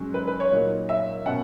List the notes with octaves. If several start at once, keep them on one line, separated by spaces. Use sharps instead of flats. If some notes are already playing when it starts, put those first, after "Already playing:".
Already playing: G#2 F#3 C#4
B4
B4
C#5
A#2 F#3 A#3 D#4
E5
B2 A#3 C#4 F#5